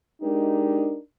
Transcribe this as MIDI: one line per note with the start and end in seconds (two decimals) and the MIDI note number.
0.22 0.97 56
0.22 0.97 62
0.22 0.97 63
0.22 0.97 67
0.22 0.97 70